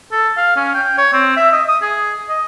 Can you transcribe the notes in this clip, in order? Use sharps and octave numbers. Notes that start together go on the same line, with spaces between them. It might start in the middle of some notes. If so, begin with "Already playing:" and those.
A4
F5
C#4
G5
C#5
C4
E5
D#5
D#6
G#4
D#5